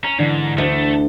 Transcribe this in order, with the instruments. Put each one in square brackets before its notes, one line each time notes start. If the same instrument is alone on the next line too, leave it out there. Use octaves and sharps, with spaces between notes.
[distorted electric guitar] C#4 [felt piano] A#5
[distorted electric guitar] G#2 [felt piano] D3 E3 D4
[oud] D2 [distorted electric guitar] A3